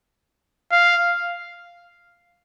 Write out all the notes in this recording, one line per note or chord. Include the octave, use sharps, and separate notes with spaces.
F5